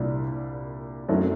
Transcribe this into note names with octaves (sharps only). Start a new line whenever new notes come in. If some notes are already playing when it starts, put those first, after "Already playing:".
Already playing: C2 A#2 G3 D4
F#2 D#3 F#3 A3 C4